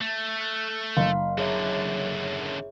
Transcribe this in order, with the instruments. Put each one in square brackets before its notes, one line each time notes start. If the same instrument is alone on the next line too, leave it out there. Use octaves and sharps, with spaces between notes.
[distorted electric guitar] A3
[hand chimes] F#6
[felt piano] F#1 [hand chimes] F5 C6
[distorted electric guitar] F#2 D3 [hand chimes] G#4 C#5 E5